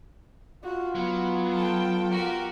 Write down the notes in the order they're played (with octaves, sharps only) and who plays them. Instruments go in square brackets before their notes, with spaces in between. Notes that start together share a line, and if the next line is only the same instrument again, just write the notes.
[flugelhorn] F4 [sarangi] F#4
[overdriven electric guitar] F#3 [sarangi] B3
[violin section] A4 G5
F#4 G4 A#4